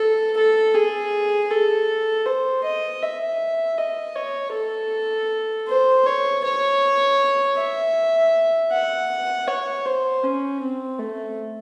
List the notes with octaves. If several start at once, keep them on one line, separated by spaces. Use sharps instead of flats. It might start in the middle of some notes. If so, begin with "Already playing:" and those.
Already playing: A4
A4
G#4
A4
C5
D#5
E5
D#5
C#5
A4
C5
C#5
C#5
E5
F#5
C#5
C5
C#4
C4
A3